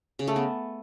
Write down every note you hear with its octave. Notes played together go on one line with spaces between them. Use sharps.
C#3
A3
B3